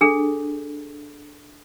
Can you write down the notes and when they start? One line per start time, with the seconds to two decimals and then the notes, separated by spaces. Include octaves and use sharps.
0.01 D4 G#4 A4